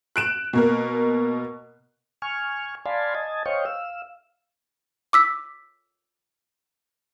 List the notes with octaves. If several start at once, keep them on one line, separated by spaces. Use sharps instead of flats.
F#6 D7 E7
B2 A#3 A#4
G#5 C#6 F6
D5 F5 G#5 A5 B5 C6
D#5 G#5 A5
C5 C#5 D#5 F5 G5 C#6
F5 E6
D6 E6 B6